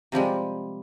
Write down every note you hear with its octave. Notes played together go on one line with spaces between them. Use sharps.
C3 F3 G3 G#3